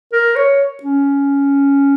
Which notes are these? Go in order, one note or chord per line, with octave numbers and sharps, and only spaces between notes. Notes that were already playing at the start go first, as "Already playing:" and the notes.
A#4
C#5
C#4